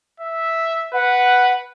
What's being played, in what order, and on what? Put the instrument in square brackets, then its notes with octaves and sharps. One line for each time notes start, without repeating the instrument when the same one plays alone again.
[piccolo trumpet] E5
[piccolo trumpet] B4 [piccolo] F#5